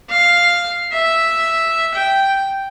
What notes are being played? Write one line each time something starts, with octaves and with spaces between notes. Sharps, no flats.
F5
E5
G5